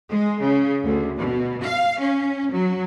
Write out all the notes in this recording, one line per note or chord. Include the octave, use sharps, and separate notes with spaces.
G#3
C#3
D2
B2
F5
C#4
F#3